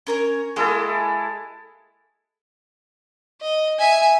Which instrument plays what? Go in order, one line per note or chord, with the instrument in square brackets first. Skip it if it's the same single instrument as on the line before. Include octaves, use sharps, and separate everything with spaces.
[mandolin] C#4 A#4 C#5
[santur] G#3 E4 A4 [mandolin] A#3 G4
[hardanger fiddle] D#5
E5 G#5